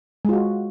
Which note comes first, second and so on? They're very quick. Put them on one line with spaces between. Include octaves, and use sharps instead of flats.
G#3 F4 F#4